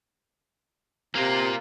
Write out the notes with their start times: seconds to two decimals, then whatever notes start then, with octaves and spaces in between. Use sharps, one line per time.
1.15 C3 A#3 F4